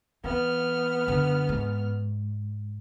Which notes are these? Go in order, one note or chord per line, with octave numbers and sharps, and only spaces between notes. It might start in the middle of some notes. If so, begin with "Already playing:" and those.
E3 B3 F6
F#2 D3
G#2